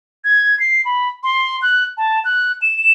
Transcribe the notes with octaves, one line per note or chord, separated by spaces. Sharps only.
G#6
C7
B5
C6
F#6
A5
F#6
E7